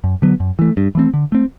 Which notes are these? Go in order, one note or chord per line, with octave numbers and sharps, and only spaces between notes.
F#2
D3 F#3 B3
F#2
E3 A3
G2
E3 A3 C4
D3
A3 C4